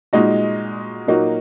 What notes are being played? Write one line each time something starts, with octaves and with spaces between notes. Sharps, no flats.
A#2 G#3 D#4 F#4
A#2 F#3 A#3 D#4 F#4